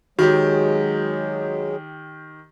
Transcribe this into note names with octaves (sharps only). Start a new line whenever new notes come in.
D#3 F#3 G#3 F#4 G4